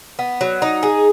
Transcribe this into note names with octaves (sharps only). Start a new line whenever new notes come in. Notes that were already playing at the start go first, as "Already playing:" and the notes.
B3
F#3
D#4
G#4